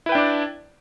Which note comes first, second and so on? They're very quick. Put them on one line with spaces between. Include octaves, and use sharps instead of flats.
E4 B4 G5 D4 D5